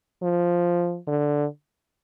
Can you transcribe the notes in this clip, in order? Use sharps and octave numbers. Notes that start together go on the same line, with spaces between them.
F3
D3